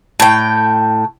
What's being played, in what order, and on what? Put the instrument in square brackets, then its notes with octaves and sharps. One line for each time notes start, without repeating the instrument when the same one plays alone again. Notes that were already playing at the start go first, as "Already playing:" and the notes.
[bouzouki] A2 G5